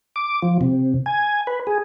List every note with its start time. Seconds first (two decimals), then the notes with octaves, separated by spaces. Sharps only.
0.16 D6
0.42 F3
0.61 C3
1.06 G#5
1.47 B4
1.67 G#4